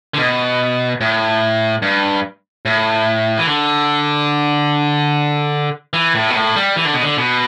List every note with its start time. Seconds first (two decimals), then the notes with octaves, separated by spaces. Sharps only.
0.14 D3
0.18 B2
1.01 A2
1.82 G2
2.65 A2
3.38 E3
3.47 D3
5.93 E3
6.15 A2
6.30 B2
6.35 A2
6.56 G3
6.76 E3
6.85 D3
6.94 B2
7.03 D3
7.18 B2